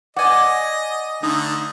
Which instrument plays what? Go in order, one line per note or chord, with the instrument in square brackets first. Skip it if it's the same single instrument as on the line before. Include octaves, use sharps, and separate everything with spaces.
[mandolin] D5 G#5 [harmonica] D#5 [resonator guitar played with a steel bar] F#5
[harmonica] D3 A3 [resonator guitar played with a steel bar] D#4